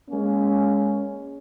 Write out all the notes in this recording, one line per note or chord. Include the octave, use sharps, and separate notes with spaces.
G#3 A#3 C#4